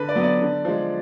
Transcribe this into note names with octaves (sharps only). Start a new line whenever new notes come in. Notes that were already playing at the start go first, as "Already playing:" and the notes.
Already playing: D3 B4
D5
F#3 B3
D5
D3
F3 G#3